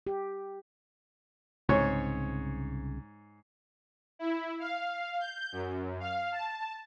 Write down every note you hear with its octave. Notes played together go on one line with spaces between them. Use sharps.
G4
C2 G#2 C#3 C4 C#5
E4
F5
G6
F#2
F5
A5